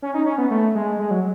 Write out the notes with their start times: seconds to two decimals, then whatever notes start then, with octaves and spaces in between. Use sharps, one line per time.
0.02 C#4
0.14 D#4
0.26 C#4
0.38 B3
0.51 A3
0.75 G#3
0.99 G#3
1.11 F#3